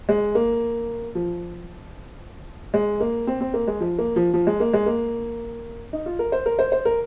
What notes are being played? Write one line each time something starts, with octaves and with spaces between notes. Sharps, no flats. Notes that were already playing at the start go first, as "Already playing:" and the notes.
G#3
A#3
F3
G#3
A#3
C4
C4
A#3
G#3
F3
A#3
F3
F3
G#3
A#3
G#3
A#3
D#4
F4
A#4
C5
A#4
C5
C5
A#4